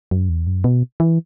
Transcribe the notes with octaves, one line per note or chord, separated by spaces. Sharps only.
F#2
E2
F#2
B2
E3